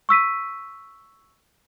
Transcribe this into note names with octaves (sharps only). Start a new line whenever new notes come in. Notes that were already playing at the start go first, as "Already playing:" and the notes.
C#6 E6 B6 D#7